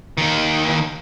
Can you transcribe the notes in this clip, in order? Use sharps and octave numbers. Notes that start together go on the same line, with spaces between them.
D#2 D#3